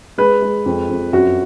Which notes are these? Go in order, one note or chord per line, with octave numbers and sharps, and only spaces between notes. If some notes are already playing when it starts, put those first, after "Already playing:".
G#3 B4
G#3
F2
F2
F#2 F#4